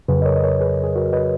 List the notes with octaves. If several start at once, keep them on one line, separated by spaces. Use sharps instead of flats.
F2 C#3 F#3 G#4 B4
D#5
A#4 C#5
D#5
A#4 C#5
G#4 B4
G#4
F#4 A#4
B4 D#5